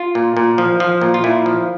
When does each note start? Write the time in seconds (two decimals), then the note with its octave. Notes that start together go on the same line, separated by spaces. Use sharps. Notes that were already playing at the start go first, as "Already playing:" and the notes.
Already playing: F4
0.15 A#2
0.37 A#2
0.58 F3
0.80 F3
1.01 A#2
1.14 F4
1.24 A#2 E4
1.46 F3